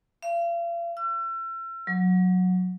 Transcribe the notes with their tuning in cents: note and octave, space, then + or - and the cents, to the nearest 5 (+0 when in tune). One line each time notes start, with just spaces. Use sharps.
F5 -40
E6 +40
F#3 -15